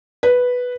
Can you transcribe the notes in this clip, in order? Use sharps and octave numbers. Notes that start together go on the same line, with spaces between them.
B4